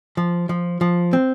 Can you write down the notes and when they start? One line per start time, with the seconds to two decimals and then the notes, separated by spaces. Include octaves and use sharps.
0.17 F3
0.49 F3
0.81 F3
1.13 C4